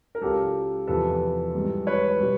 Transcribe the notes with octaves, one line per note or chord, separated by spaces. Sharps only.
A#4
C#2 C#3 F#3 G4 A4
E2 C3 F3 A4 B4
G#2 E3 G3
B4 C#5
B2 G3